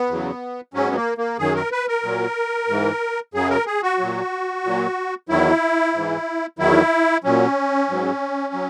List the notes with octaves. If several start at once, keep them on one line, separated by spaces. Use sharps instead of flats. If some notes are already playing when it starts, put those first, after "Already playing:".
Already playing: B3
E2 C#3 F#3
G#2 F#3 C#4
B3
A#3
A#3
F#2 D#3 F#3 G#4
A#4
B4
A#4
A#2 F#3
G#2 E3
F#2 C#3 F#3 G#4
A#4
G#4
F#4
A#2 F#3
A#2 F#3
E2 D#3 F#3 E4
G#2 E3
E2 D#3 F#3 E4
A#2 F#3 C#4
G#2 F#3
F#3